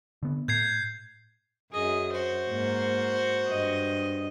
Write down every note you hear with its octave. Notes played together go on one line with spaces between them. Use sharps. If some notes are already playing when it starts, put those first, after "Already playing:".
D3 B3
A2 G6 G#6 C7
F#2 G#4 D#5
F#4 C5
G#2 A#3
G2 D#5